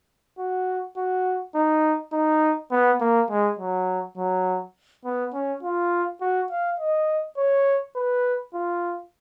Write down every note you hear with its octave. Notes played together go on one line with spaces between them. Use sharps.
F#4
F#4
D#4
D#4
B3
A#3
G#3
F#3
F#3
B3
C#4
F4
F#4
F5
D#5
C#5
B4
F4